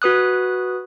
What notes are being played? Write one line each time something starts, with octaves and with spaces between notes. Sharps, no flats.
F#4 B4 D#6 F#6